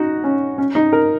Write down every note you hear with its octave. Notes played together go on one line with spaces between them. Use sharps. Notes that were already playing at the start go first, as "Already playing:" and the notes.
Already playing: D#4 F#4
C#4
C#4
D#4
A#4